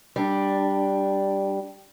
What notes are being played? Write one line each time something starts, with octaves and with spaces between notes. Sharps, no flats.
G3 D4